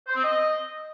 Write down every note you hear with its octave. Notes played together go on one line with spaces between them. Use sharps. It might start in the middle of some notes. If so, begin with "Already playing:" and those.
C5
C4
D#5